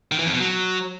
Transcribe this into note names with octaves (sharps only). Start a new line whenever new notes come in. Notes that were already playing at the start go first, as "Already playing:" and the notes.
D#3
E3
F2
B2
F#3